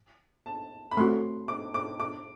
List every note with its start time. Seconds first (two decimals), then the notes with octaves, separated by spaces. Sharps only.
0.46 A5
0.91 B5
0.97 A3 C4 F#4 C6
1.48 D6
1.74 D6
2.00 D6